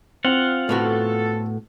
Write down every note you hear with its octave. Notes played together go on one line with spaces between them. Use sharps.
C4 F4 F5 F#5
A2 B3 F#4 A4